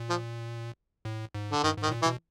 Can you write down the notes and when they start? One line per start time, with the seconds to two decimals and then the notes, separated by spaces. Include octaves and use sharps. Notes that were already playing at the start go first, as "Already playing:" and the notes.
Already playing: A#2
0.09 F3
1.05 A2
1.35 G#2
1.51 D3
1.63 G2 D#3
1.77 G#2
1.83 D#3
1.88 A2
1.91 A#2
2.02 E3
2.06 B2